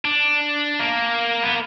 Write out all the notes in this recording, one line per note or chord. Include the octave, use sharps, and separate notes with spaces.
D4
A#3
B3